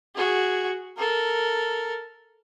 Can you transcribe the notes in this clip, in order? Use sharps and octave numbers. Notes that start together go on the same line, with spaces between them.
F#4 G#4
A4 A#4